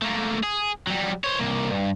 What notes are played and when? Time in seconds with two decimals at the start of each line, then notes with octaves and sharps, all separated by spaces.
0.02 A3 A#3
0.44 G#4
0.87 F#3 G3
1.24 C5 C#5
1.40 C2 A#3
1.71 G2